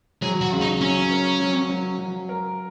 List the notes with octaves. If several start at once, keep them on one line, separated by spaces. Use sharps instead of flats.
F#3 G#4
F#4
C#3
D#4
F#3 C#4
A#4
F#3
F#3
F#3
A#4